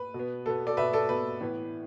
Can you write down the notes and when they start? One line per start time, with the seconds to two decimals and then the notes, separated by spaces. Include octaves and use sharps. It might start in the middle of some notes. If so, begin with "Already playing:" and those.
Already playing: B4
0.14 B2
0.19 B3
0.46 B2 B3 A4
0.67 A4 D5
0.77 B2 B3 B4 E5
0.93 A4 D5
1.09 B2 B3 B4
1.40 A2 E3 B3